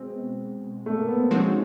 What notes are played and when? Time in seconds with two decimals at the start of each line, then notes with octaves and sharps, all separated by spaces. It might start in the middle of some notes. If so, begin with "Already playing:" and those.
Already playing: B2 G#3 C4
0.86 A3
0.98 A#3
1.08 B3
1.19 C4
1.31 F3 G#3 C4 C#4 D#4 F#4